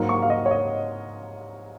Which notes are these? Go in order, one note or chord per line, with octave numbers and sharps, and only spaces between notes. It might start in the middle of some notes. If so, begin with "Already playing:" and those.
Already playing: G#2 F#3 A#3
C#6
F5
D#5
C#5
D#5